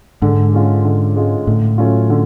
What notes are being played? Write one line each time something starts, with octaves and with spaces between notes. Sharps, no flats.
G#2 D3
G#3 C#4 F4
D3
G#3 C#4 F4
A2 D3
F#3 A3 C#4 F4
D3